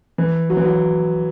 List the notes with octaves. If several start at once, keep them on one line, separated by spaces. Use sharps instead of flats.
E3
F#3
E3
F#3